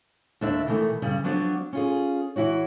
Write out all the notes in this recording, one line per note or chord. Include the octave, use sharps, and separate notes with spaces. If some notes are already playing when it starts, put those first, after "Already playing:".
D#2 D4 E5
B2 D#3 E3 A3
G2 C#3 G3
F3 F#3 B3 D4 G4
C#4 F4 G#4
E3 E4 F#4 C#5